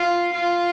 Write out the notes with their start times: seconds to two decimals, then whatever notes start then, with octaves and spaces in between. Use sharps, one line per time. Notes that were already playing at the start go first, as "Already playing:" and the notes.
Already playing: F4
0.34 F4